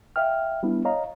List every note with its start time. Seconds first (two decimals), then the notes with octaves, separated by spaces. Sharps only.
0.16 E5 F5 G5 F6
0.63 G3 B3 D4 E4
0.85 C#5 D#5 F5 A#5